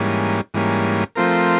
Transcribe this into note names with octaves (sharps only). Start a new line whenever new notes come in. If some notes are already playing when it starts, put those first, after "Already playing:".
Already playing: G#2 E3 G3 A#3 C#4
G#2 E3 G3 A#3 C#4
F3 A3 C4 F4 A#4